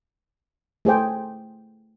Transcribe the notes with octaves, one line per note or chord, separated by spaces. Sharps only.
A3 G#4 C5 G5